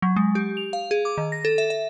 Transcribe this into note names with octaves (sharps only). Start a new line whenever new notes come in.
F#3
G#3
G4
F7
F5
G#4
D6
D#3
A#6
A4
E5
E5